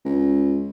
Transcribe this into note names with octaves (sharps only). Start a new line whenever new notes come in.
C#2